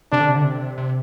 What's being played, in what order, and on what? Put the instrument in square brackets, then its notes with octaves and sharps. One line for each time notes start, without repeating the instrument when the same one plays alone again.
[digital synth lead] C3 [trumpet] D4
[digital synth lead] D3
C3
D3
C3
C3